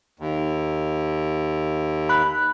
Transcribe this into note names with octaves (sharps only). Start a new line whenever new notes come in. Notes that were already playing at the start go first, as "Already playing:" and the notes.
D#2
B5 F#6